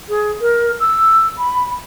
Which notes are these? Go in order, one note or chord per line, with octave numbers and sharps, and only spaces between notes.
G#4
A#4
E6
B5